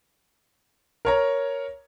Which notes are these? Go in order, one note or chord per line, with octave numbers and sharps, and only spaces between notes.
A#4 C#5 A#5